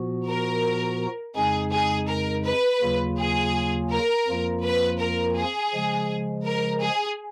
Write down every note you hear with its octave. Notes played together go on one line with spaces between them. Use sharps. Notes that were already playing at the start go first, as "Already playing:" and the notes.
Already playing: A#2 F3 B3 F#4
A#4
F2 C#3 G#3 D#4 G#4
G#4
A#4
B4
D#2 C#3 F#3 A#3 F4
G#4
A#4
F2 F3 A#3 F4
B4
A#4
G#4
C#3 F3 G#3
A#4
G#4